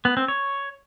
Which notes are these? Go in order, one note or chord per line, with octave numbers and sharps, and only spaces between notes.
B3
C4
C#5